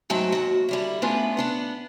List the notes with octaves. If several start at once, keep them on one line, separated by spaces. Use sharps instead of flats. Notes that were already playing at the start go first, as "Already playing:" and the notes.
G#2 F#3 A3 G5 A5
D#2 F#4
D3 G3 E4
A3 B3 C#4 D4 F4 B4
B3 D4 F#5